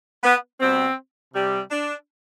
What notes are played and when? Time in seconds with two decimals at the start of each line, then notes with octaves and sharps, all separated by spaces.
0.24 B3
0.60 B2 G3 C4
1.34 C3 G3
1.70 D4